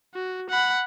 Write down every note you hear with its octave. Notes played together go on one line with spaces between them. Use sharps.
F#4
F#5 B5